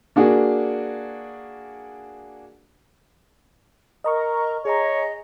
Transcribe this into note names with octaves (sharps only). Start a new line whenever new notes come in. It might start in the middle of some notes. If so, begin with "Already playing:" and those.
A#3 D4 F#4 G#4
A#4 D#5 A#5 C#6
G#4 C#5 D#5 G#5 A#5